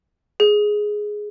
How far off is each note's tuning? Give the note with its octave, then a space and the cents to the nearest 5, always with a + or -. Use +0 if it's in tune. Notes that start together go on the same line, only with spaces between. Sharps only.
G#4 +5